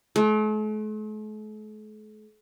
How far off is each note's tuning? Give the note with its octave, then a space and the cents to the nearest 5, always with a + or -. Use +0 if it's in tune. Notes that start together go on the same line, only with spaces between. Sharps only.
A3 -45